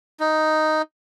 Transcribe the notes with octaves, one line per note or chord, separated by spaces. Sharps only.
D#4